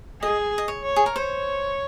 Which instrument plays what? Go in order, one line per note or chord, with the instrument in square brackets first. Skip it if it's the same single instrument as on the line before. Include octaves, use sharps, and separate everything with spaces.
[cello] G#4 [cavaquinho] D#5
[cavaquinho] D#5
C#5
[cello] C#5
[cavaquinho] G#4
A#4
[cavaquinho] C5 [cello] C#5